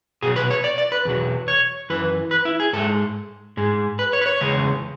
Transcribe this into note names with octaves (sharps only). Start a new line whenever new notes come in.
B2 F#3 G#4
B4
C#5
D5
D5
B4
E2 B2 F#3
C#5
F#2 E3 B4
B4
E4
G#4
G#2 G#3 A4
G#2 G#3
B4
C#5
B4
C#5
E2 C#3 G#3